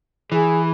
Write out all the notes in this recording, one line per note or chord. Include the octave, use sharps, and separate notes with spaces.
E3 G#4